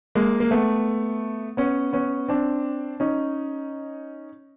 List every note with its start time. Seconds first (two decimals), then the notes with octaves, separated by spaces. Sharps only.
0.15 G#3 A#3
0.40 A#3
0.51 A3 B3
1.57 B3 C#4
1.93 B3 C#4
2.28 C4 D4
3.00 C#4 D#4